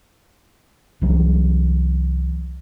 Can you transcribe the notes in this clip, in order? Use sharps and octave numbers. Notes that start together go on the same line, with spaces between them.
C2 E3 F#3